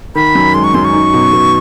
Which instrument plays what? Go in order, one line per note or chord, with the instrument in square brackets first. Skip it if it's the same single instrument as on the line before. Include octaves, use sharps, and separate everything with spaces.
[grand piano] D#3 [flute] B5
[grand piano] F#2
[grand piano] G#3 [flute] C6
[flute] C#6
[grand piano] F#2 [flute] C6
[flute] C#6
[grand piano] D#4
B2
B2